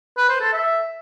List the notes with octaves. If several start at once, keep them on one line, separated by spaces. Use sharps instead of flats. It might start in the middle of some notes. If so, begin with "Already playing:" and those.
B4
C5
A4
E5